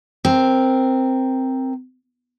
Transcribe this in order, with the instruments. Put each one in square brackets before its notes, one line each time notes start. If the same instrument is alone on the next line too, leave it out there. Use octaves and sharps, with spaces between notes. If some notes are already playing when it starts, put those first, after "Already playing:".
[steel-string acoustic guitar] C4 A#4